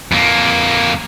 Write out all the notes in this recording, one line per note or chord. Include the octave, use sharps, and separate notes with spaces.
F2 A#3